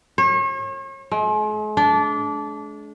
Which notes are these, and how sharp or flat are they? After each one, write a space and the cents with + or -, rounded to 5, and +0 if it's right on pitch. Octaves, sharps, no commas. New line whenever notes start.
C#5 -40
G#3 +45
D4 -20